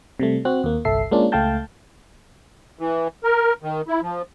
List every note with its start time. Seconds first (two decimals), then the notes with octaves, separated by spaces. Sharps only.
0.19 C3 G3 A3
0.45 C4 F#4 F#6
0.64 D#2 A#3
0.85 G1 C2 A4 E5 C7
1.11 G#3 A#3 C#4 D4 F4
1.32 C#2 A3 F5 G5 A5 G6
2.79 E3
3.24 A#4
3.63 D#3
3.88 E4
4.02 F3